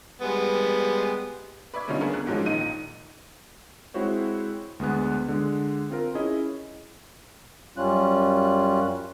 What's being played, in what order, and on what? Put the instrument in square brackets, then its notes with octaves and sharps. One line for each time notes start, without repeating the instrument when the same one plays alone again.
[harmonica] G3 G#3 B3
[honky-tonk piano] B4 D5 E5 C#6 G#6
B2 D3 G3 C#4 D#4 F4
D#3 A3 B3 D4 G#4 A#4
F#6
G#2 D#3 F3 F#3 G#3 C#4
A#1 D#3 D#4 D#7
[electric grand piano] G#3 C4 E4 F#4 C5 C#5
D2 G#3 B3 F#6
D3 G#3
C4 F4 A#4
C#4 E4 G#4 D#5
[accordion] F#2 G3 C#4 F4 F#6